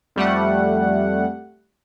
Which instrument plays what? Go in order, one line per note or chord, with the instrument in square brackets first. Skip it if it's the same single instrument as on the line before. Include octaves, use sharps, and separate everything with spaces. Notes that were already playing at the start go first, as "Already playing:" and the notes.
[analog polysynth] F2 G3 A3 F#5